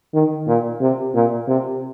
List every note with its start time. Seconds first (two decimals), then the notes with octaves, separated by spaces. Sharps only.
0.14 D#3
0.47 A#2
0.81 C3
1.14 A#2
1.47 C3